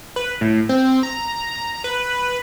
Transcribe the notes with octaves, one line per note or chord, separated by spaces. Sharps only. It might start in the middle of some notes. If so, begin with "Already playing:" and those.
B4
A2
C4
A#5
B4